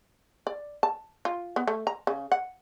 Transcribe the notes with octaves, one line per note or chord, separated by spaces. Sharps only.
D5
A5
F4
B3
A3
A#5
C#3
F#5